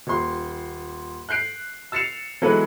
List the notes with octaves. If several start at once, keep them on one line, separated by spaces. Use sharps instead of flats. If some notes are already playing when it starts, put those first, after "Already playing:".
D#1 C6
F#6 G6 C7 D7
E6 A6 C7 C#7 E7 F7
E3 F#3 G#3 B3 A4 B4